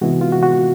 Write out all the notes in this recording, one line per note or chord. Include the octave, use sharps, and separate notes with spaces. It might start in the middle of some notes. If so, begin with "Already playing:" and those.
C3 E3 G#3 B3 E4 F#4
F4
F#4
F#4